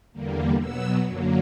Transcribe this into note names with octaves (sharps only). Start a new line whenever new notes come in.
E2 D3 G3 A#3
B2 F#3 B3 E6
F#2 D3 F#3 A#3